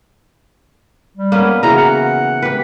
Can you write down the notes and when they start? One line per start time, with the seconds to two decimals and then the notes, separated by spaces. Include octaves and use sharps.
1.17 G3
1.32 A#3 B3 C#4
1.63 C#3 E3 F#4 A#5
1.78 F#5
2.42 G4 B4